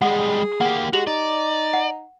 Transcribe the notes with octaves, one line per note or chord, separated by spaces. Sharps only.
G3 G#3 G#4 F#5
A#3 G4 F#5
G#3 F#4 G4 F7 F#7
D#4 D5
F#5